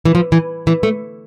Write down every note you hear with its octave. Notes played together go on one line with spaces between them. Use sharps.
E3
F3
E3
E3
A3